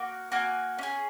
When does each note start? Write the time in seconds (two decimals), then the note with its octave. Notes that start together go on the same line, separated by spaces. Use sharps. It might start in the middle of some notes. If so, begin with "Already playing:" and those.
Already playing: A#3 F#4
0.32 A#3 F#4 G#5
0.79 C#4 G#4